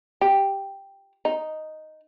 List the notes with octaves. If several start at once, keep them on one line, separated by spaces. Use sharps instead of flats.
G4
D#4